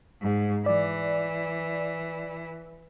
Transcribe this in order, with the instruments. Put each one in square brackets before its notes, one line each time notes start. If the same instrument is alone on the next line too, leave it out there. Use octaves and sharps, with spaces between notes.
[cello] G#2
[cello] E3 [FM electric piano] D5